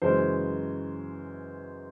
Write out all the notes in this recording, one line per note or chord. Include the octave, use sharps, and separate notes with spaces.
F#2 C#3 E3 G#3 C#4 C5